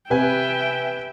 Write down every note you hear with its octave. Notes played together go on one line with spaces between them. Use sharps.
C3 C4 G4 B4 E5 G5 G#5